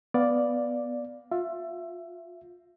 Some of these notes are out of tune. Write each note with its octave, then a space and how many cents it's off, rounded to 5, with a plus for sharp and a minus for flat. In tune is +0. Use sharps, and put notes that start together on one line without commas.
B3 +0 D5 +0 F5 +10
F4 +25 E5 +20